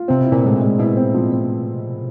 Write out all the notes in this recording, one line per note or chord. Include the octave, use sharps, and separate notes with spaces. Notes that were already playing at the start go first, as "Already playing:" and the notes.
Already playing: F4
C3 C4
B2
E4
A#2
A2 G#3
A#2
G#3
B2 E4
C4
A#2 F3
C4